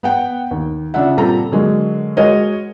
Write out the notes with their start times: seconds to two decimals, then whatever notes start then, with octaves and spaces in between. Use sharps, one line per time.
0.03 B3 F#5 G5
0.51 D#2
0.94 C#3 D4 F4 E5 F#5
1.17 A#2 G3 C4 A4 A#5
1.52 D3 F#3 G#3 A#3
2.17 G#3 F#4 A#4 C#5 D#5